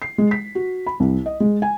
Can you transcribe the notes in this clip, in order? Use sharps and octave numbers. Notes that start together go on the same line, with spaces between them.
C7
G#3
B6
F#4
B5
C2
D#5
G#3
G#5